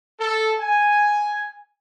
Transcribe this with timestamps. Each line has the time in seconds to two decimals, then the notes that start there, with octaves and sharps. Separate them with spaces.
0.19 A4
0.60 G#5